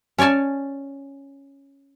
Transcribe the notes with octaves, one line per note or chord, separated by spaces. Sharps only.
C#4 C#5 D5 G#5 A5